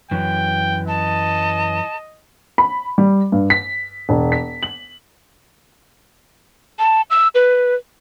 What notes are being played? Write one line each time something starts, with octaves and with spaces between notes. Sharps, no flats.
F#2 E3 G5
D#5 A5
B5
G3
G2
B6
E1
B6
F#7
A5
E6
B4